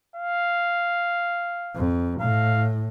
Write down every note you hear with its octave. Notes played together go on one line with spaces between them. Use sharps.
F5
F2
A2 F5